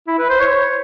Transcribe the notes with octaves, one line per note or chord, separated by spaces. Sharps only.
E4
B4
C5
C#5